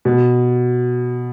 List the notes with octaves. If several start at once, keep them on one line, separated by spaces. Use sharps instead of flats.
B2